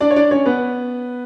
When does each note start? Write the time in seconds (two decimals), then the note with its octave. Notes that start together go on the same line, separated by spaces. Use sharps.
0.01 D4 D5
0.11 C#5
0.16 D4 D5
0.31 C#4 C#5
0.46 B3 B4